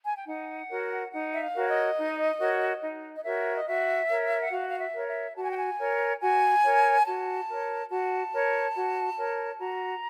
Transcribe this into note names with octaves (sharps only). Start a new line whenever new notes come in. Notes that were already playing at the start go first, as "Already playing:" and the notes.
G#5
G5
D#4 F#5
F#4 A#4 C#5
D#4 F#5
E5
F5
F#4 A#4 C#5
D#5
D#4
F#4 A#4 C#5
D#4
D#5
F#4 A#4 C#5 E5
D#5
F#4 E5
A#4 C#5
F#5
F#4 F5
F5
E5
A#4 C#5
E5
F#4 A5
G#5
G5
G#5
A#4 C#5
F#4 G#5
A#4 C#5
F#4 A5
A#4 C#5
F#4 A5
A#4 C#5
F#4
A#4 C#5
F#4 A#5